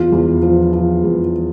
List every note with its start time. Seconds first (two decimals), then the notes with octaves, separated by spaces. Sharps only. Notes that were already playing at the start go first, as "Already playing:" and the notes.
Already playing: E2 F4
0.12 E2
0.43 F3
0.73 F3
1.04 E2